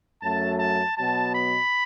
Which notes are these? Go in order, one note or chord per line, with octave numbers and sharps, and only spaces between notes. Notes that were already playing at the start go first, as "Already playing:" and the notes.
F#2 F#3 A3 C#4 A5
A5
B2 F#3 B3 A5
B5